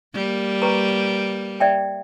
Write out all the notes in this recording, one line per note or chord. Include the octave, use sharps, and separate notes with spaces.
G3 A#3
G4 B4 A#5
D5 E5 G5